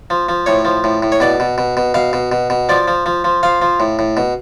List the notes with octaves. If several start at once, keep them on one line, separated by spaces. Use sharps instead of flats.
F3
F3
A2 C#5
F3
A2
A2
C#5
B2 D5
B2
B2
B2
B2 F5
B2
B2
B2
F3 D5
F3
F3
F3
F3 F5
F3
A2
A2
B2